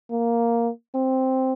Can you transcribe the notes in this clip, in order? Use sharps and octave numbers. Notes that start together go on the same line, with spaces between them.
A#3
C4